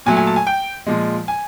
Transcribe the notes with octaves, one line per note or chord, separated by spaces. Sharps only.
A#2 F#3 A3 G#5
G#5
A5
G#5
G5
A#2 F3 G#3
G#5